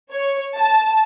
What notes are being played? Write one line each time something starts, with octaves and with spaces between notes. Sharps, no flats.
C#5
A5